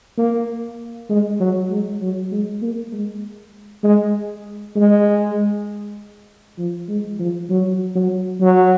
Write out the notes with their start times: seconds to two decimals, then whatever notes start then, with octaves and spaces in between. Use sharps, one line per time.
0.18 A#3
1.10 G#3
1.40 F#3
1.70 G#3
2.01 F#3
2.32 G#3
2.62 A#3
2.92 G#3
3.84 G#3
4.76 G#3
6.58 F3
6.88 G#3
7.19 F3
7.50 F#3
7.95 F#3
8.41 F#3